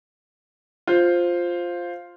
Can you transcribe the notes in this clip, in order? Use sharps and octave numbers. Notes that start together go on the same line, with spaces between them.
F4 C5